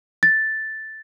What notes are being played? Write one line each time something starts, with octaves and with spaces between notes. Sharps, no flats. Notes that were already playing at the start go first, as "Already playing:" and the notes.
A6